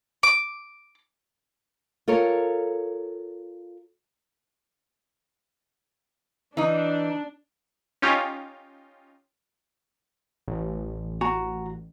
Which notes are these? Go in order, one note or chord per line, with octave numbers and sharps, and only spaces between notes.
D6
F4 A4 A#4 C#5
E3 D4 D#4
C#4 D#4 F4 G4
A1
F#4 A#5